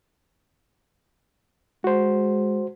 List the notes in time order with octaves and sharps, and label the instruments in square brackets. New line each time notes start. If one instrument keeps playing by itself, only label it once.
[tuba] G#3 [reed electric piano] F#4 C5